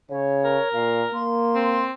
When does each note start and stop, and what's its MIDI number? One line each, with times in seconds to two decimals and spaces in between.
0.10 0.59 49
0.10 0.69 73
0.45 1.25 70
0.74 1.05 46
0.74 1.01 77
1.14 1.88 58
1.14 1.84 84
1.55 1.92 60